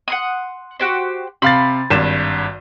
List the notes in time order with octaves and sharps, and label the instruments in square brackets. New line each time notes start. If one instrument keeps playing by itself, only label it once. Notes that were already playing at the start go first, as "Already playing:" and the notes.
[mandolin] F#5 C6 D#6
F#4 G4 C5
[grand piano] C3 F5 A6 [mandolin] B5 C6
[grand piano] G#1 G2 E7